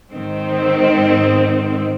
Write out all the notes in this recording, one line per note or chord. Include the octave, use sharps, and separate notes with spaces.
G#2 D#3 C4